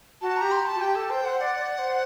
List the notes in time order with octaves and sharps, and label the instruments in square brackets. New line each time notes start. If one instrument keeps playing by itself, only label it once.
[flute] F#4 [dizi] A5
[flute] G4 [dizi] A#5
[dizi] C6
A5
[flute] F#4
[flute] G4 [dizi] G5
[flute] A4 [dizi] A5
[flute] C5 [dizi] G5
[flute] C5 [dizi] F#5
[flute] D5 [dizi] F#5
[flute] D5
C5